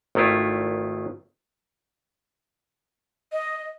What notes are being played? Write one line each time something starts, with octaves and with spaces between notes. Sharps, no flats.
G#1 D#3 A3 E4 F4
D#5